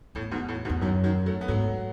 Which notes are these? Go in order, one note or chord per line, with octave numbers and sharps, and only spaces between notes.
E2 A2
G#2 B2
A2
G#2 B2
E2
F#2 D#3 F#3
D#3 F#3
F#3 A3
B3
G#2 F#3 A3